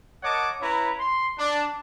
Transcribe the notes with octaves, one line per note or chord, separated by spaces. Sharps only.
A#4 C#5 D#5 F#5 A5 D6
C#4 E4 B4 C#5 A#5
C6
D4